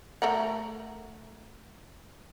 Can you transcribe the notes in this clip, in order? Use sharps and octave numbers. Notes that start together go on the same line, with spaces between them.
A3 A#4 F#5